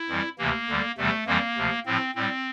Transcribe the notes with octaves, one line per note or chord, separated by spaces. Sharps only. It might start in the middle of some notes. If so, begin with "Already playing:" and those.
Already playing: E4
F2 E3 G3
D2 C3 E3 A#3
D2 D3 G3
E2 C3 E3 G3 A3
F2 E3 G3 A#3
D2 C3 F3
A2 F3 C4
A2 G3 C4